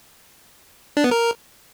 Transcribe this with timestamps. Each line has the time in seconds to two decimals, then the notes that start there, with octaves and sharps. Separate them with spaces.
0.97 D4
1.04 B3
1.11 A#4